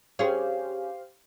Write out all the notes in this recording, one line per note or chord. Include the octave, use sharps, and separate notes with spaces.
C#4 G4 G#4 C5 F5